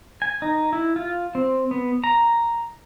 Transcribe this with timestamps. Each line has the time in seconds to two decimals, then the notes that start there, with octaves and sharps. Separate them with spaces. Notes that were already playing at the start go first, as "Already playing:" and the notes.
0.22 G#5
0.42 D#4
0.73 E4
0.96 F4
1.35 C4
1.71 B3
2.04 A#5